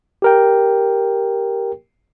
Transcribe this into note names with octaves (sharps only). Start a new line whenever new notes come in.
G4 A#4 G5